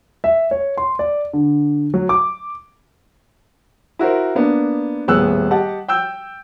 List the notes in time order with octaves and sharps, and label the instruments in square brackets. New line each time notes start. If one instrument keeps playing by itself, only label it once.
[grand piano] E5
C#5
C6
D5
D3
F#3
D6
[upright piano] E4 F#4 A#4 C5
A#3 B3 D4
D#1 A2 B3 G#4 E6 F#6
G4 D#5 F#5 A5
G5 E6 G6